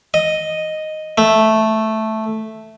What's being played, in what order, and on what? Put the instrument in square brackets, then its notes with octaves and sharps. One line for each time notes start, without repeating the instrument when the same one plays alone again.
[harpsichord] D#5
A3